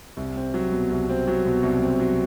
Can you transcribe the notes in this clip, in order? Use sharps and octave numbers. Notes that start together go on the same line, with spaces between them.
C2
C4
F#3
B2
C2
C4
F#3
B2
C2
C4
F#3